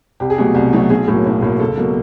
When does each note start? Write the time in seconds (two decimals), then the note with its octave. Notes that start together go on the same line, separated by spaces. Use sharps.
0.20 C2 G4
0.30 G#4
0.38 B2 F#3 A3 G4
0.55 C2
0.73 B2 F#3 A3
0.90 B1 G#4
1.08 A2 F#3 A#3
1.26 B1
1.42 A2 F#3 A#3
1.60 C#2 A4
1.77 B2 F#3 A#3